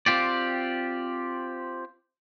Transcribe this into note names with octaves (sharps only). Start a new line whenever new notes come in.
C4 F4 G4 D5